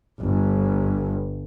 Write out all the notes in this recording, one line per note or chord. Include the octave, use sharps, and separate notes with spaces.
G1